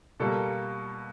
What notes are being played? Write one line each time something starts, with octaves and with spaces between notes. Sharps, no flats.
B2 G3 A#3 A4